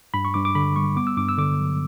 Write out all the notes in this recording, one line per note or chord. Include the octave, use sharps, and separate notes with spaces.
G2 B5
C#6
G2 D6
D6
D3 B5
G3 C#6
B3 D6
E6
G2 D6
E6
D3 D6
F#3